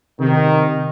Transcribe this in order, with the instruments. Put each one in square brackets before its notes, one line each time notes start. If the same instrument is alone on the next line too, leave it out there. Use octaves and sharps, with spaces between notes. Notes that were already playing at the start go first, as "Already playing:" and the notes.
[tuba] C3 [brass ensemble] D#3